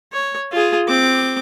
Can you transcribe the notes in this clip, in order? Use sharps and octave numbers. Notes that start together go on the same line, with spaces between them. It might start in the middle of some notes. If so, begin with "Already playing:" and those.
C#5
F4 G#4
C4 D6